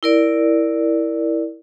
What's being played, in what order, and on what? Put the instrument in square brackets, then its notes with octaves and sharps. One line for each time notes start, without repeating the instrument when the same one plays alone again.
[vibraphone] E4 A#4 D5